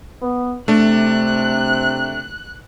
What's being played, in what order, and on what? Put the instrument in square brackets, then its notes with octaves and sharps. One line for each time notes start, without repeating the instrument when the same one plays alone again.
[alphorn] B3
[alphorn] C3 [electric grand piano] A3 D4 [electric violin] F#6